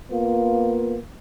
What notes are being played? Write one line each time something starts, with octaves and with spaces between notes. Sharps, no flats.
A#3 B3 F4